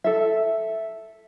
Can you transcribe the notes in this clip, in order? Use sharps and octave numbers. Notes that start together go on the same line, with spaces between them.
A4 E5